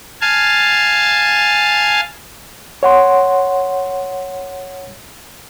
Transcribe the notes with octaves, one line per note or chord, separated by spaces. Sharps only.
F5 G#5 A5
C#5 F#5 C6